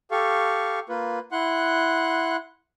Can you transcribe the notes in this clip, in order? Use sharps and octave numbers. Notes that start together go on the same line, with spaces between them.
G4 A4 F5 C#6
A#3 F4 B4
E4 F#5 C6 F#6